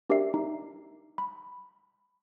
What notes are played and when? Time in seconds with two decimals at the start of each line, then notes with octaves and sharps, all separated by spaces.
0.10 D4 G4 A#4 D5 E5 C7
0.34 D#4
1.18 B5